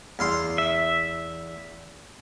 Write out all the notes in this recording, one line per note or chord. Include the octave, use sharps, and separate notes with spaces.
E2 F5 C6
E5